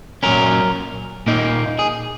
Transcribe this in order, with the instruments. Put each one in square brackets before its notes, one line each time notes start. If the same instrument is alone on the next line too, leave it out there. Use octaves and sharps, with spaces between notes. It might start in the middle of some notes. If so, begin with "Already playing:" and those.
[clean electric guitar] A#2 F#3 C#4 A#4
A#2 A#3 D#4
G#4